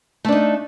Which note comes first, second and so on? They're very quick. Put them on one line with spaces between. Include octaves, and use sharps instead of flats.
A3 D4 D#4